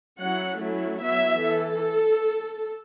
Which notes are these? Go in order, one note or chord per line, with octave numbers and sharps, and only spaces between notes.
F#3 C#4 E4 F#5
F#3 A3 C#4 E4
F#3 B3 E4 E5
E3 A4